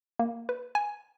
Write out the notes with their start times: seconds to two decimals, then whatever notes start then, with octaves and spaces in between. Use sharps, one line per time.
0.19 A#3
0.49 B4
0.75 G#5